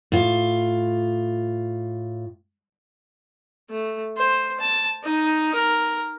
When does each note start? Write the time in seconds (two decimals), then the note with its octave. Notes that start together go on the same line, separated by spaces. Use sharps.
0.12 A2 F4
3.70 A3
4.17 C5
4.60 A5
5.04 D#4
5.54 A#4